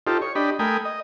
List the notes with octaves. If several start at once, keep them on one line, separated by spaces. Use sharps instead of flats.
D#4 F4 G4 A4 C5
C#5
D4 G4 D#5 B5
A3 A#4 G5 G#5 B5 D#6
D#5